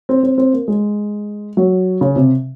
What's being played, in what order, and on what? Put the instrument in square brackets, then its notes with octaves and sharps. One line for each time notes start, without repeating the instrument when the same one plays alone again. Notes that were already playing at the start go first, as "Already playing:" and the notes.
[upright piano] C4
C4
C4
A#3
G#3
F#3
C#3
C3